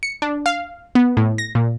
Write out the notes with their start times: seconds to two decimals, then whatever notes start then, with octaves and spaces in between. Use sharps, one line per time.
0.03 C#7
0.22 D4
0.46 F5
0.95 B3
1.17 A2
1.38 A#6
1.55 A#2